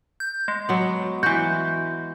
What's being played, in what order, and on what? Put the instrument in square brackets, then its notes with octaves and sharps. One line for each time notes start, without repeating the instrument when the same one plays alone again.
[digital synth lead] G6
G#3
[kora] F#3 B3
[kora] E3 F#4 [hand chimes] G6